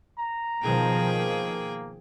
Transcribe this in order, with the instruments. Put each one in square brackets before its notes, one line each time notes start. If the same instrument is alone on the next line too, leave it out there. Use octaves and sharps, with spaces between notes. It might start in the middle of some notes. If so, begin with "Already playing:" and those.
[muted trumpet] A#5
[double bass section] B2 D#3 F3 [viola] G#4 G5
[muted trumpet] A#3